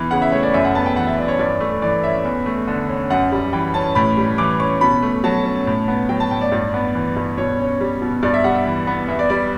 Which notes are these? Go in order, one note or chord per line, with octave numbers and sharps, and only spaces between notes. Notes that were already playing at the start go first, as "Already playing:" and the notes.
Already playing: E2 E3
C#3 F#5
E5
A3 C#5
D5
F#2 E5
F#5
B3 A5
G5
E3 F#5
E5
F#2 D5
C#5
G2 D5
A3
E3 D5
C#4 E5
E2
A3
D3
C#4
F#2 F#5
G3
E3 G5
C#4 A5
A2 B5
G3
E3 D6
C#4 C#6
B2 B5
A3
F#3 A5
C#4
A2
B3
F#3 G5
A5
A2 G5
D5
G2
B3
E3
G2
B2 C#5
C#4
G3
B2
G2 D5
E5
G3 F#5
E5
E3
B3
E2 E5
D5
G3 D5